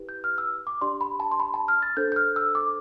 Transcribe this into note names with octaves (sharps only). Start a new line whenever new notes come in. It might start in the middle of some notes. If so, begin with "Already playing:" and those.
Already playing: E4 G4 B4
G6
F6
E6
D6
D4 G4 D5 C6
B5
A5
C6
B5
A5
F6
A6
D4 A4 C5 G6
G6
F6
E6
D6